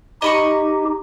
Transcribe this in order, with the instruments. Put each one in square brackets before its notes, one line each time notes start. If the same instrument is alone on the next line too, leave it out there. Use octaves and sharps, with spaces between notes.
[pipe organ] D#4 G4 [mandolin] D#5 B5 C#6